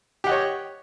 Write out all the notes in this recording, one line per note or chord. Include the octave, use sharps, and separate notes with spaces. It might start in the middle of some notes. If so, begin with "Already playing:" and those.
G4 C#5 D#5 F#5